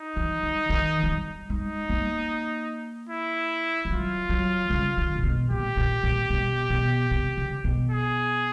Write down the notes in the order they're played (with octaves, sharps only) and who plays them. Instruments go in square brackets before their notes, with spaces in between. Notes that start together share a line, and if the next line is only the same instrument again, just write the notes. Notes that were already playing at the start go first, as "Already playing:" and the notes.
Already playing: [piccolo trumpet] D#4
[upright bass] E3
D#3
D#3
F#3
G3
[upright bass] G#3 [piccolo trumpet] D#4
[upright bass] A#3
[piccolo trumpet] E4
[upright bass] G3
[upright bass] F#3 [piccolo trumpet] F4
[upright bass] F#3
C#3
D3
A#2
B2
[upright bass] A#2 [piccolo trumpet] G4
[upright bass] A#2
A#2
B2
B2
C3
C#3
B2
[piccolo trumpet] G#4